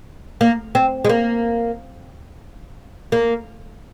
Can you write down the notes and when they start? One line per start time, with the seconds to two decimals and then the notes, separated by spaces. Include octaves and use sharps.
0.41 A#3
0.75 C4
1.05 G#3
1.09 A#3
3.12 A#3